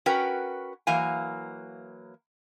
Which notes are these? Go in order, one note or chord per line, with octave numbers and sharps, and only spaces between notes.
C#4 F#4 A#4 B4 G5
E3 F#3 A#3 F5 G#5